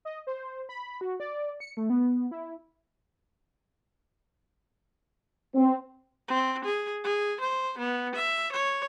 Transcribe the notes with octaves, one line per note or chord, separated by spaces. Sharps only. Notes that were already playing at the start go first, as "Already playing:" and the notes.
D#5
C5
B5
F#4
D5
C#7
A3
B3
E4
C4
C4
G#4
G#4
C5
B3
E5
C#5